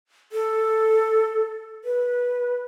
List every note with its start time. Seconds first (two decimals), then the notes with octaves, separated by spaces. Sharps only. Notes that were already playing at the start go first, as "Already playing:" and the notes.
0.32 A4
1.85 B4